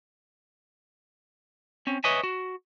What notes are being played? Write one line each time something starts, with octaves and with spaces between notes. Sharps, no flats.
C4 C#4
B4 C#5 D#5 E5 G#5
F#4